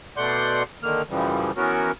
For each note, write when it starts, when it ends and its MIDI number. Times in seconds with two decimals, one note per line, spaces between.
0.17 0.63 47
0.17 0.63 57
0.17 0.63 74
0.17 0.63 78
0.17 0.63 84
0.17 0.63 91
0.83 1.02 50
0.83 1.02 51
0.83 1.02 58
0.83 1.02 89
1.10 1.51 42
1.10 1.51 49
1.10 1.51 52
1.10 1.51 53
1.10 1.51 55
1.57 1.91 52
1.57 1.91 59
1.57 1.91 61
1.57 1.91 66
1.57 1.91 70